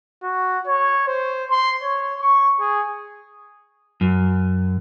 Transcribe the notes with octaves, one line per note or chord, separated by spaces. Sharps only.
F#4
C#5
C5
C6
C#5
C#6
G#4
F#2